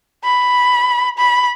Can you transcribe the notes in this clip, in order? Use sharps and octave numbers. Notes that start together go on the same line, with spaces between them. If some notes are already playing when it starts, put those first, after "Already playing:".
B5
B5